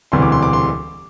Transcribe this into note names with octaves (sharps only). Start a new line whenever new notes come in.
E1 D2 C3 E3 G3 C6
D6
C6
D6
C6